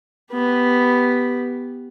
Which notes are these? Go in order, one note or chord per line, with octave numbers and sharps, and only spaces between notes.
B3 G4